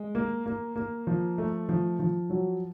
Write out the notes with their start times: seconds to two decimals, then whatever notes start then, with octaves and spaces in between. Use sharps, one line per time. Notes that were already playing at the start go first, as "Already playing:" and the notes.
Already playing: G#3
0.15 A#3
0.46 A#3
0.76 A#3
1.07 F3
1.38 A3
1.69 F3
2.00 F3
2.30 F#3